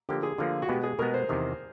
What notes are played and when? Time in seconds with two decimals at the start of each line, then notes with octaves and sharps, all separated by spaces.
0.09 D3 F3 A#3 G4
0.23 G#4
0.38 D3 F3 A#3 F4
0.62 F#4
0.69 B2 G#3 B3 G4
0.83 G#4
0.99 B2 G#3 B3 A#4
1.14 C5
1.29 E2 C3 D#3